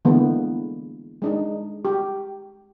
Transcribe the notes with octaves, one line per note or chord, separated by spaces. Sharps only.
D3 E3 G#3 A#3 B3
G#3 D4 D#4
G4